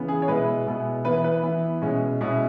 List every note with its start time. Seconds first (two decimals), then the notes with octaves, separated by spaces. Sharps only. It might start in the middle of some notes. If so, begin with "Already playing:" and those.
Already playing: C#3 E3 B3
0.08 G#4
0.22 C#5
0.28 B2 G#3 B3 E4 B4
0.67 B2 G#3 B3 E4
1.05 E3 B3 E4 B4
1.24 B4
1.43 E3 B3 E4
1.82 B2 G#3 C#4 E4
2.21 B2 G#3 C#4 E4